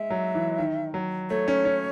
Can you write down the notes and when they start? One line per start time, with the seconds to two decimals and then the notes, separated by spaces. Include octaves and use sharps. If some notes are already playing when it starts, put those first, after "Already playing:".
Already playing: G#3 E5
0.10 F#3
0.35 E3
0.58 D#3
0.94 F#3
1.30 A3 C#5
1.48 C#4
1.65 C#4